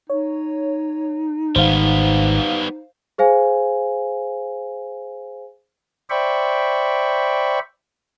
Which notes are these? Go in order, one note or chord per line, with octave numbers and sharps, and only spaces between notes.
D#4 C#5
G#1 G3 B3 C5 F5
G#4 C5 F5 G#5
C5 D5 E5 G5 B5 C#6